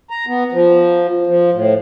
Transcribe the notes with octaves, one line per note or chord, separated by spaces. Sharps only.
A#5
B3
F3
F3
A2